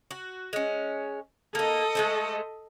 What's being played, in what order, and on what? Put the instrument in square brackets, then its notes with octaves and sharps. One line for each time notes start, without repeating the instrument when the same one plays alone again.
[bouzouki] F#4
G#3 C#4
[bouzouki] A#3 D#4 [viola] A4 D#5
[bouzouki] G#3 A3 C5